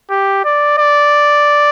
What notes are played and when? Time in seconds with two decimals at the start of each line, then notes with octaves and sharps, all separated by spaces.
0.10 G4
0.45 D5
0.78 D5